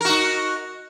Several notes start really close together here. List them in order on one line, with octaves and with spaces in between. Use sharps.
A#4 F#4 D#4